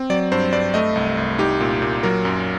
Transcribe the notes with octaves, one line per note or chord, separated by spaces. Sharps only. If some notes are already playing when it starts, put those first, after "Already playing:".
Already playing: C4
F#3 D5
G2 C5
G2 D5
A3 D#5
C2
C2
D#4 G4
A#2
A#2
F#3 A#4
F#2